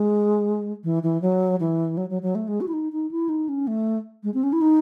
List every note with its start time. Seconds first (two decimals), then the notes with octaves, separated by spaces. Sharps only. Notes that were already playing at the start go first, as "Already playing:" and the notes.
Already playing: G#3
0.84 E3
1.03 E3
1.22 F#3
1.60 E3
1.97 F#3
2.10 F#3
2.22 F#3
2.35 A3
2.48 G#3
2.61 F#4
2.68 E4
2.73 D#4
2.92 D#4
3.11 E4
3.29 D#4
3.49 C#4
3.67 A3
4.24 G#3
4.34 C4
4.43 C#4
4.53 E4
4.61 D#4